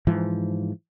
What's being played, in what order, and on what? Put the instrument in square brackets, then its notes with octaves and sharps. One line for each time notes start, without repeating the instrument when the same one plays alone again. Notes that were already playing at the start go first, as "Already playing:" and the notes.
[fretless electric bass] G#2 E3 F3